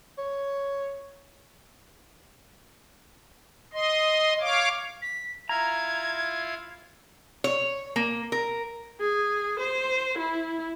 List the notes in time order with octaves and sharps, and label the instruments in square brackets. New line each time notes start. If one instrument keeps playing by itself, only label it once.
[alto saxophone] C#5
[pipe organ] D#5 C6
C#5 F5 D6
[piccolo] B6
[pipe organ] E4 F4 F5 [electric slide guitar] A#5 [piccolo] G#6
[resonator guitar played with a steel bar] C#5
A#3
A#4
[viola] G#4
C5
E4